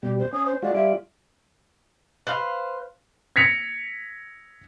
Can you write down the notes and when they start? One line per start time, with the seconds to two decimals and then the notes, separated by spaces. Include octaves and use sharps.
0.03 B2 G3 G4
0.19 C5
0.33 C#4 D#6
0.46 C5
0.62 G#3 F4 F#4 D5
0.75 G3 F4 D5 E5
2.27 B4 C5 F5
3.36 G#6 A#6 B6 C#7 F7